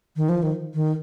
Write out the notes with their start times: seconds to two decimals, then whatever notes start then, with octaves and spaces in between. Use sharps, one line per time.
0.16 D#3
0.29 F3
0.43 D#3
0.75 D#3